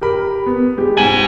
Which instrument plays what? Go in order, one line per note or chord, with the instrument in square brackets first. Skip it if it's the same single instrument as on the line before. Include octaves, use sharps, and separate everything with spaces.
[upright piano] G4 A#4 B5
B3
G#3 G4
[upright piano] C#2 F#5 F#7 [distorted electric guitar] D#4 G#5